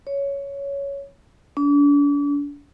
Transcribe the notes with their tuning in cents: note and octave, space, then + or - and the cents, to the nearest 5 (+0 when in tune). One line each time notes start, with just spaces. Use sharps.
C#5 +10
D4 -40